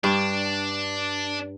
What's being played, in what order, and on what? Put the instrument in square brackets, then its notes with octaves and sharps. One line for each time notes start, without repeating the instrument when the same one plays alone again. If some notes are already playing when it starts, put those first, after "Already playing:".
[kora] G2 [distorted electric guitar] D4